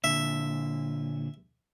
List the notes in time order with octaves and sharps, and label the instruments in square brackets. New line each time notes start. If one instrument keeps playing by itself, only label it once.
[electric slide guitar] A#2 D3 [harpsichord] E5